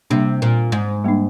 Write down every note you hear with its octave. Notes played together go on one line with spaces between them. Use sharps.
C3 G3 A#3 D4
A#2
G#2
G3 A#3 D4